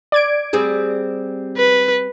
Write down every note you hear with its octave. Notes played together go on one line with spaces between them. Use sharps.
D5 G#6 D7
G3 C4 G#4
B4